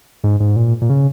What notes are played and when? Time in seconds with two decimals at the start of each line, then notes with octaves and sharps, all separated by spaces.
0.24 G#2
0.40 G#2
0.56 A#2
0.82 A#2
0.90 C#3